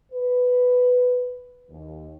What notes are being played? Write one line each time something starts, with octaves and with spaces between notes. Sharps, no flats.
B4
D#2